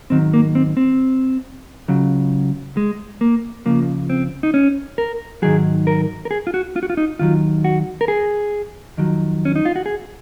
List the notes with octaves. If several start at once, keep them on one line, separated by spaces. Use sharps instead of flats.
G#2 D#3 F#3 C4
A#3
C4
C4
C#2 C#3 F#3
G#3
A#3
C#2 C#3 F3 A#3
C4
D#4
C#4
A#4
G#2 D#3 F#3 G#4
A#4
A#4
G#4
F4
F#4
F4
F#4
F4
D#4
D#2 D#3 F#3 F4
F#4
A#4
G#4
F2 D#3 F#3
C#4
D#4
F4
F#4
G#4